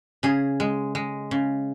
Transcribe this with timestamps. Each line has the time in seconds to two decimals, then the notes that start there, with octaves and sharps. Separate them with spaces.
0.23 C#3 G#4
0.60 G#3
0.95 G#3
1.31 C#3